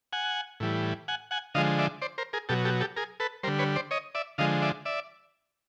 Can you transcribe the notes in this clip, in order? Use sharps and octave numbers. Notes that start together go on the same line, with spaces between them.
F#5 G#5
A2 E3 G3
F#5 G#5
F#5 G#5
D3 F3 G#3 D#5 F5
D5 E5
C5 D5
A#4 C5
G#4 A#4
B2 F#3 G4 A4
G4 A4
G4 A4
G#4 A#4
A4 B4
D3 G3 A#4 C5
B4 C#5
C5 D5
C#5 D#5
D5 E5
D3 F3 G#3 D#5 F5
D5 E5
D5 E5